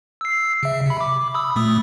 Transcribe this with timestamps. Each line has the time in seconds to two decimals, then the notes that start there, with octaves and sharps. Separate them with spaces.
0.21 E6 C7
0.63 C#3 E5
0.86 C3 B5
1.01 D6
1.34 B5 D#6 E6
1.56 A#2 A3 D#6